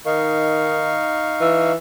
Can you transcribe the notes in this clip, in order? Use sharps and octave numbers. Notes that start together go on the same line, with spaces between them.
D#3 D#4 F5 C#6
E3